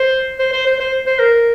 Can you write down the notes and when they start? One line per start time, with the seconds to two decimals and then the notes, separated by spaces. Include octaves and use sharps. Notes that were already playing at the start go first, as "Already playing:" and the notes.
Already playing: C5
0.39 C5
0.53 C5
0.66 C5
0.80 C5
1.06 C5
1.20 A#4